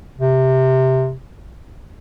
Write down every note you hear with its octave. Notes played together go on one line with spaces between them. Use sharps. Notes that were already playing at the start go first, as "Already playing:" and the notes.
C3